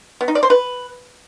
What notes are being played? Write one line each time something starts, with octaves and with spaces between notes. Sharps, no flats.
B3
D#4
D5
C5
B4